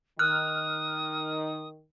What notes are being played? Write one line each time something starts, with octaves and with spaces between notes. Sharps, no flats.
D#3 D#6 F6 F#6